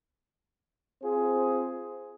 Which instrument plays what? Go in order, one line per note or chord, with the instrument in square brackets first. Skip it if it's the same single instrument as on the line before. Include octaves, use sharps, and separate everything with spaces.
[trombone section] C4 F4 G#4 C5